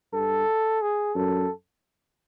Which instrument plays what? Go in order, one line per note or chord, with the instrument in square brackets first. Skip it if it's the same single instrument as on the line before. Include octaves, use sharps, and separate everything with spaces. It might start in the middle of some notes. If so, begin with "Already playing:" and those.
[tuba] G2 [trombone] A4
[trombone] G#4
[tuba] F#2 [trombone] A4